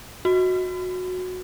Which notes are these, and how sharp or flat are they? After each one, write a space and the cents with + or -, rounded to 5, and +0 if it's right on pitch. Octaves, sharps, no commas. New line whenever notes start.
F#4 -15